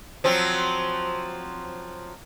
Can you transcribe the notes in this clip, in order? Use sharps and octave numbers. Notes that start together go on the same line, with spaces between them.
F3 F#3 C4